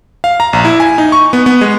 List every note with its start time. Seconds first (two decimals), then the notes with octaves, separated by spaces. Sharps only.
0.24 F5
0.40 A#5
0.53 A#1
0.65 E4
0.80 G#5
0.98 D#4
1.12 C#6
1.33 B3
1.46 B3
1.61 G#3